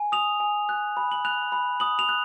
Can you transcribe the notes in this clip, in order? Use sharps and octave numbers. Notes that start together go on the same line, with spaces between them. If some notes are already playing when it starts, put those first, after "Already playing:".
Already playing: G#5
D#6 F7
G#5
F#6
B5
F#7
F#6 F7
B5
D#6 F#7
F7
F#6